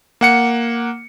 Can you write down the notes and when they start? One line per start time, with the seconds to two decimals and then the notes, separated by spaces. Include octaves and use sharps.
0.21 A#3 F#5 C#7